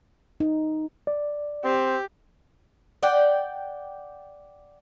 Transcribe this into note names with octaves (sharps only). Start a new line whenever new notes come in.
D#4
D5
C4 G4
D5 F#5 G5